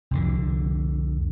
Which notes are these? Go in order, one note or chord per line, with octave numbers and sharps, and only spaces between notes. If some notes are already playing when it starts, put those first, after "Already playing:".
C2 F2 D3